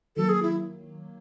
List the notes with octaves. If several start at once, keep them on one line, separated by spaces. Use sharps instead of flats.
D#3 F#3 A#3 A4
G#4
E4